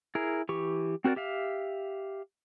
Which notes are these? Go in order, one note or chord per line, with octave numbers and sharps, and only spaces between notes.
E4 G#4 A#4
E3 G4 C#6
C4 F#4 A#4 C5 D5
G4 E5 F5